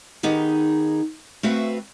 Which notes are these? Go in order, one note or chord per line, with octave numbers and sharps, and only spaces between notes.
D#3 B3 D#4 G4 G#4
A3 C4 F#4 B4 E5 F5